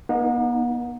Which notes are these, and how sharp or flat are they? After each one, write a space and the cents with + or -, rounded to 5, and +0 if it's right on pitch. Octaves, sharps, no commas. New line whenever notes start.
B3 -40 D#4 +0